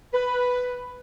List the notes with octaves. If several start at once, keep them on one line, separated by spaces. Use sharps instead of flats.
B4